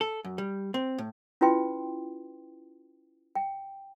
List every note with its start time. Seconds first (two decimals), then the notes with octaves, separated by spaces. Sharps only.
0.01 A4
0.25 F#2
0.38 G3
0.74 C4
0.98 A2
1.41 C#4 E4 F4 B4 G5 C6
3.35 G5